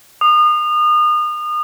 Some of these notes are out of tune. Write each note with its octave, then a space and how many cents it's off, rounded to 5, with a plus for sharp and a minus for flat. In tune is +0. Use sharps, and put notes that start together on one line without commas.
D#6 -35